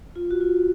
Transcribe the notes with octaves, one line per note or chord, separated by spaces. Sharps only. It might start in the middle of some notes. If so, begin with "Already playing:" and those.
F4
F#4
F4